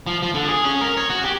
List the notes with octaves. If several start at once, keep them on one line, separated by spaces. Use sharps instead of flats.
F3
F3
D3
G#4
C#4
A#4
C#5
F#4
G4